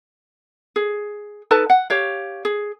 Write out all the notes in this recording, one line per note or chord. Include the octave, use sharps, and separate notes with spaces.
G#4
D#4 A4 B4 A5
F#5
G4 C#5 F5
G#4